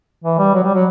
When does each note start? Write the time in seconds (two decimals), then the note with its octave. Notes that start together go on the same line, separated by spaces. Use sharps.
0.24 E3
0.39 G3
0.54 F#3
0.64 G3
0.74 F#3